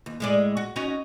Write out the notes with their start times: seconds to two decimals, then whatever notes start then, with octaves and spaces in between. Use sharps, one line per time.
0.06 D#2
0.20 A2 G#3 D5
0.57 F#4
0.76 C#4 D#4 F#4